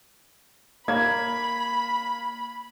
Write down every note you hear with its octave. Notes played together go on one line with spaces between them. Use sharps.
A#3 B5 G#6